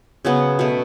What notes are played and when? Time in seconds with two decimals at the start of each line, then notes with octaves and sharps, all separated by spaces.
0.25 C#3 F#3 B3 C#4
0.59 B2 A3